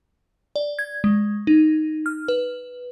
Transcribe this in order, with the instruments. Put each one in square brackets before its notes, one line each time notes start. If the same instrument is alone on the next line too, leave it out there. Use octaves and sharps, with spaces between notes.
[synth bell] D5
G#6
G#3
D#4
F6
B4